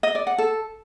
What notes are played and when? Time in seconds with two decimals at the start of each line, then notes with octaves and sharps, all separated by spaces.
0.03 D#5
0.15 D5
0.27 F#5
0.38 A4